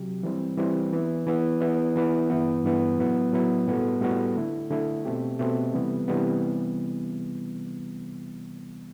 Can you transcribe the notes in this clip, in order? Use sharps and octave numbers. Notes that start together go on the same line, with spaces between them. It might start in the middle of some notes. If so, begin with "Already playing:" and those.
Already playing: C3 F#3 G4
E3 G3 C4
E3 G3 C4
E3 B3 E4
E3 B3 E4
E3 B3 E4 B4 D5
E3 B3 E4 B4 D5
G2 E3 B3
G2 E3 B3
A2 F#3 B3 E4
A2 F#3 B3 E4
A2 G3 B3 F#4 A4
A2 G3 B3 F#4 A4
D3 A3 E4
D3 A3 E4
B2 A3 C4 G4
B2 A3 C4 G4
C3 E3 G3 B3
C3 E3 G3 B3